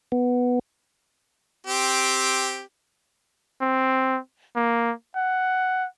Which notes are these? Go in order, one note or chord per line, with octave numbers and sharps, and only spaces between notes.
B3
C4 G4
C4
A#3
F#5